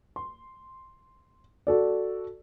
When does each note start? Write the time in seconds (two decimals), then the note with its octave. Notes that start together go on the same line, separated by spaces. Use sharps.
0.16 C6
1.67 F#4 A4 D5